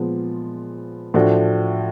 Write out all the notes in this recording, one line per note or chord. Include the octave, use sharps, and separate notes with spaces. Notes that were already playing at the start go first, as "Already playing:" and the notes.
Already playing: A#2 F3 G#3 B3
A2 F3 A3 D4 F#4